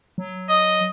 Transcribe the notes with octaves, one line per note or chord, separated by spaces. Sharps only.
F#3
D#5